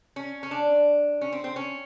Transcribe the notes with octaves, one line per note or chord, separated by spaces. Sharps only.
C#4
C#4
D4
C#4
C4
C4
C#4